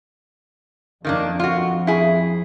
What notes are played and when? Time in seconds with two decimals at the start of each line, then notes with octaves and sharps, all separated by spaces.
1.05 F2 D#3 A#3 D4
1.40 F4 F#4
1.87 E4 G#4